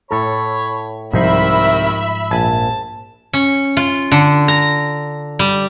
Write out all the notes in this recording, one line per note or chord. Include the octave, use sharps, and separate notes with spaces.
A2 A4 C#5 B5
C2 G#2 D#3 F3 D#4 C5 E5 B5
A#1 G#5 A5
C#4
F4
D3
A#5
G3